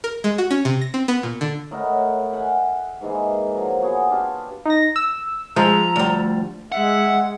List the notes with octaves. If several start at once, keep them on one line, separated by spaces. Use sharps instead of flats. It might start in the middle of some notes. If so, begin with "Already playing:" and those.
A#4
G#3
F#4
C#4
C3
A#6
C4
B3
A#2
D3
A2 A#4 D#5 F#5
E5 F#5 G#5
G#2 E3 G#3 A#3
F3 F#3
B3 F#4 G#4
D4 F4 G4
D#4 A#6
E6
F3 G#3 A#5
D2 G3
G#3 E5 F#5